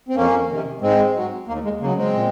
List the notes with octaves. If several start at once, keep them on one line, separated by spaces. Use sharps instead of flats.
C4
F2 A#3 C#4
C3 D#3
G#2 G#3 C4
F#3
D#2 A#3
G#3
C#3 F#3 A#3
G#3 C4
A#2